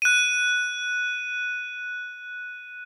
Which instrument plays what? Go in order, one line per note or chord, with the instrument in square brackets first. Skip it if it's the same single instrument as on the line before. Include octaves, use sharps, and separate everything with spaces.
[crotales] F#6 D#7